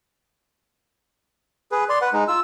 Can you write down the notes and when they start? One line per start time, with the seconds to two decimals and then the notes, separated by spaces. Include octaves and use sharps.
1.72 G#4 B4
1.89 D5 C6
2.02 B4 F#5
2.13 G#3 D#4
2.28 F4 E6